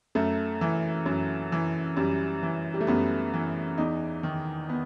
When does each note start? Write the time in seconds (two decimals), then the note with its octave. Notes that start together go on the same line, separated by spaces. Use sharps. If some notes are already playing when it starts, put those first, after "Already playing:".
0.15 F#2 A3
0.61 E3
1.06 F#2 F#3
1.52 E3
1.97 F#2 G3
2.43 E3
2.74 G3
2.80 A3
2.87 F#2 B3
3.34 E3
3.78 E2 D#4
4.23 D#3
4.69 B3